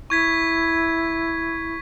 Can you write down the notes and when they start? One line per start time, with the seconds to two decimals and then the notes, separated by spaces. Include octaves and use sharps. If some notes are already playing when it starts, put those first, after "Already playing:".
0.10 E4 C#6 G#6 B6